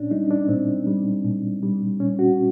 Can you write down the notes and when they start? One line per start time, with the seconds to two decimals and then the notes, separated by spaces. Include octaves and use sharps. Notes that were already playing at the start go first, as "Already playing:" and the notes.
Already playing: A#2 C#4 D4
0.11 G3 D#4
0.31 D4
0.49 A#2 C4
0.87 G3
1.25 A#2
1.63 G3
2.00 A#2 C#4
2.19 F#4